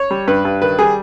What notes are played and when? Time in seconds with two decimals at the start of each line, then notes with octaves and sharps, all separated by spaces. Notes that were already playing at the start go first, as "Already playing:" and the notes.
Already playing: C#5
0.11 G3
0.28 G2 B4
0.45 G2
0.61 D#3 B4
0.79 G3 G#4